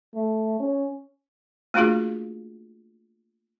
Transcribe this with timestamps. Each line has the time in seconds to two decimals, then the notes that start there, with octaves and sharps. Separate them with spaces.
0.15 A3
0.60 C#4
1.74 A3 A#3 D4 F4 F#4 G#4